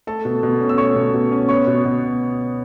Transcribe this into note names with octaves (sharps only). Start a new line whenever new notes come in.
A3 A4 A5
B2
B2
C#4
E6
A3 C#5 C#6
B2
B2
C#4
B3 C#5 C#6
B2
B2